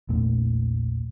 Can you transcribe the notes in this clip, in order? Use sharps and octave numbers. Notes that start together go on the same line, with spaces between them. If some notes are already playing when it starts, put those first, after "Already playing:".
A#1 E2 A#2 A3